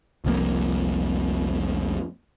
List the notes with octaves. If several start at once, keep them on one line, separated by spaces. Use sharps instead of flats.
F1 C2 F2 A#3